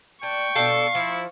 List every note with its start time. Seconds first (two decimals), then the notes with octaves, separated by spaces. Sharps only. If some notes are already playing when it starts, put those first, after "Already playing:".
0.23 D4 G5 C#6
0.56 B2 D4 A4 F5
0.95 F3 E4